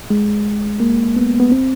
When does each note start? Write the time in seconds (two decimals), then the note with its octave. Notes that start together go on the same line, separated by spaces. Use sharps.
0.10 G#3
0.80 A#3
1.16 B3
1.40 B3
1.52 C4